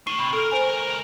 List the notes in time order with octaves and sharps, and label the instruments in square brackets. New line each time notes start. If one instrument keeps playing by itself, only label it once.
[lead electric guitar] D#3 A3 [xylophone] C7 D#7 G7
[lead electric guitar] C3 [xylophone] B5 C#6
[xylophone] A4 F6 [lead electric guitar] A#4
[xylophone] C5 G#5
[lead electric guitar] C#2 A#4